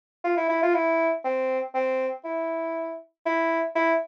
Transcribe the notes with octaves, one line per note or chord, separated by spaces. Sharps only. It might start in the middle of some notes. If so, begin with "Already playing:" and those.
F4
E4
E4
F4
E4
C4
C4
E4
E4
E4